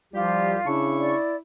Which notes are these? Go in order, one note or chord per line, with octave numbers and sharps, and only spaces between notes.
C2 F3 G3 F4 G4
C#3 D4 E4 C#6
D5